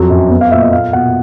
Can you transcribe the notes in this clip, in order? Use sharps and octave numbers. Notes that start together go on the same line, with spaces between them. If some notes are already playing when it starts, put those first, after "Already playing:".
Already playing: F2 F#3
F#2
B3
F5
A#2 E5
D#5
A#3 F5
B2 F#5